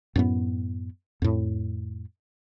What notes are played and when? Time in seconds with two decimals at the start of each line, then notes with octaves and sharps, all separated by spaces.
0.16 F#2 A2 B3
1.22 F2 A2